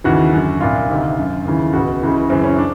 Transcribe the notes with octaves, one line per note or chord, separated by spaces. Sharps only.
D#2 C#3 E3 F#4
F#2 D3
C2 A#2 F4
D2 C3 D#3
F#2 D3
D#2 C#3 E3
C#2 B2 F#4
C#2 C#3 E3
F#2 C#3 E3 C4
C#4
D4